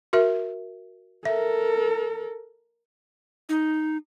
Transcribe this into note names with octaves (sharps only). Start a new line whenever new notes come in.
F#4 A#4 E5
A4 A#4 E5
D#4